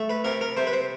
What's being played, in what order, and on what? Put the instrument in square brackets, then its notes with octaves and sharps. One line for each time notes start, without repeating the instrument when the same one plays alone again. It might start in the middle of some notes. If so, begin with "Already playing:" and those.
Already playing: [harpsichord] A3
B4
C3 A#4
A#4
C3 C5
B4
C5